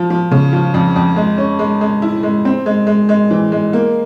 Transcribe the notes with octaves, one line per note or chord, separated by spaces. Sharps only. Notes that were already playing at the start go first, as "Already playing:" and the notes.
Already playing: F3
F3
C#3
F3
F2
F2
G#3
C#4
G#3
G#3
E4
G#3
C4
G#3
G#3
G#3
E3
G#3
A#3